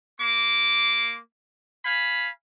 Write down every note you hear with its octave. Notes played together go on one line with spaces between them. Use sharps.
A#3 C6 D6
F5 G#5 B5